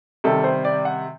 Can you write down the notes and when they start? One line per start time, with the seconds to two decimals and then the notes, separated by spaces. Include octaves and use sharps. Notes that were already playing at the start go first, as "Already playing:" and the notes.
0.24 C3 D#3 G3 A4
0.44 C5
0.65 D5
0.85 F#5